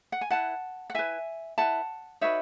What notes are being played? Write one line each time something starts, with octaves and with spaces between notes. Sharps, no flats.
F#5
G#5
E4 B4 F#5 A5
F#5
E4 B4 E5 G#5
E4 B4 F#5 A5
D#4 F#4 B4 C#5 E5